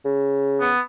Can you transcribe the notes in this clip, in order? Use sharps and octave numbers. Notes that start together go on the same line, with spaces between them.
C#3
B3